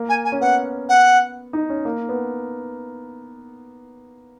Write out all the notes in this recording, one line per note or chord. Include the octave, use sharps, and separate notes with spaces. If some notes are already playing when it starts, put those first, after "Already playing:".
Already playing: A#3
G#5
G#5
C#4
B3 F#5
F#5
D#4
C#4
A#3
B3